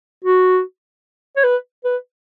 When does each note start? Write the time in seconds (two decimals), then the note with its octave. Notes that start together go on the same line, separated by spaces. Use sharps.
0.24 F#4
1.36 C#5
1.44 B4
1.84 B4